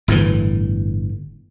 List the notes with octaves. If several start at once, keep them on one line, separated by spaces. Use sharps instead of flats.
G1 A2 C3 E3